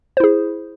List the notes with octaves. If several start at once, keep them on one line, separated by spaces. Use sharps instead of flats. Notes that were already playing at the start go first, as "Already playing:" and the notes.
E4 G#4 C5